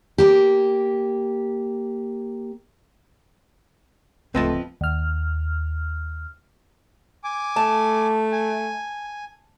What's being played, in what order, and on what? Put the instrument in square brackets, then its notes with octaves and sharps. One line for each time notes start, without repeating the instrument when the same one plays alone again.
[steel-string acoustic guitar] A#3 G4
[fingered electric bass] D1 C#2 [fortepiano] F3 B4 [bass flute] A3 [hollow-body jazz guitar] C4 D#5 A5
[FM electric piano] D#2 F6
[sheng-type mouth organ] G#5 D6
[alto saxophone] A3 [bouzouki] A5
[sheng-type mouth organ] G#5